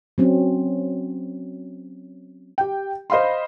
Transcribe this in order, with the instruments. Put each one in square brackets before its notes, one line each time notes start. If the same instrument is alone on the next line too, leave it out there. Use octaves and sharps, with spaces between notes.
[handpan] F#3 C4 C#4
[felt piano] G4 G5
C5 D#5 F5 B5 C6